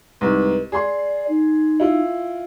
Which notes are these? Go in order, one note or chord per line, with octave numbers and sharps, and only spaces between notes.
C2 G#2 B4
G#4 D5 C6
D#4
E4 F4